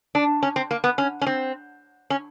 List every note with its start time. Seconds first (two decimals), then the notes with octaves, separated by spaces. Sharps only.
0.15 D4
0.43 C#4
0.56 C4
0.71 A#3
0.84 B3
0.98 C#4
1.21 C#4
1.27 C4
2.10 C#4